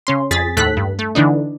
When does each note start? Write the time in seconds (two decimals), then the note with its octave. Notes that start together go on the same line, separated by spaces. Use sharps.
0.07 C#3 C#4 C6
0.31 F2 G#4 A6 B6
0.57 D#2 A2 A3 A4 F#6 B6
0.77 G2
0.99 A3
1.15 D3 E3 D4 D#4